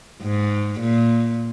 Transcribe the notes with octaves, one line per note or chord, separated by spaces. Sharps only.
G#2
A#2